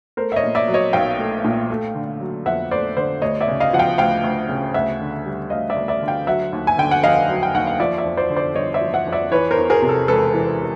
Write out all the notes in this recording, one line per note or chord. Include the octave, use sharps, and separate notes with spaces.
A3 A#4 C5
E5
C#5 D#5
A#2
D5 E5
F#3
C#5 D#5
B1 F5 G5
A3
A#2
A3
D3
F#3
F2 E5 F#5
A3 C5 D5
D3 C5 D5
D2 C#5 D#5
D5 E5
C#3
D#5 F5
F3 F#5
F5 G5
D2 F5 G5
D2
C#3
D2 E5 F#5
D3
G3
D2 D#5 F5
D5 E5
D2
D5 E5
D3
F5 G5
F#3 E5 F#5
D#2
G#5
D3 G5
F#5
F1 D#5 F5
F#3
G5
D#2 F#5
F5
F3 D5 E5
D5 E5
F2
C5 D5
D3
C5 D5
G1 C#5 D#5
D5 E5
F3
E5 F#5
F2
D5 E5
E3 B4 C#5
A#4 C5
E2
G#4 A#4
C3
A4
E1 A4 B4
E3